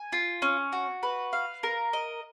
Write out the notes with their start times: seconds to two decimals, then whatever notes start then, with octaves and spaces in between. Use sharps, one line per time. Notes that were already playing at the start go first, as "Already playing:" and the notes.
Already playing: G#5
0.13 F4
0.42 C#4
0.73 F#4
1.03 B4
1.33 F5
1.63 A#4
1.93 D#5